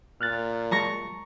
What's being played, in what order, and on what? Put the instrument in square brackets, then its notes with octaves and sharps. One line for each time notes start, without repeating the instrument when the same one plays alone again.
[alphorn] A#2 [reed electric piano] F6 F#6 A6
[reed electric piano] F#3 G#3 A5 [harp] A#5 C#6 A#6